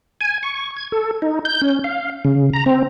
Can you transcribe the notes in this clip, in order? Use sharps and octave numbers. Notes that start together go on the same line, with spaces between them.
G#5
C#6
G#6
A4
D#4
G6
C#4
F5
C#3
A#5
C4